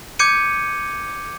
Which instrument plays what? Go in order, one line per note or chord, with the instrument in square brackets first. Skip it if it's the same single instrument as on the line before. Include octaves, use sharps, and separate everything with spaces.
[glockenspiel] D6 G6 G#6 C#7 D#7